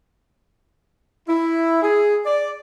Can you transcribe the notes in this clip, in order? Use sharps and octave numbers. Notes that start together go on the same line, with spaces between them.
E4
G#4
D5